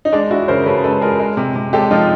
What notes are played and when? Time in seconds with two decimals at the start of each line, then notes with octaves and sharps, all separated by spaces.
0.05 D#4
0.13 G#3 D4
0.31 G#3 E4 F#4
0.48 C#3 A#4 C5
0.66 C#3 A4 B4
0.84 G#3 A4 B4
1.01 G#3 G#4 A#4
1.20 G#3
1.37 C3
1.56 C3
1.73 G#3 G4 A4
1.91 F3 D#4 F4